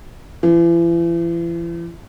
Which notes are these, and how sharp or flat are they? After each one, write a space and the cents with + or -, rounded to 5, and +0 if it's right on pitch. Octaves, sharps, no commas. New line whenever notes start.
E3 +40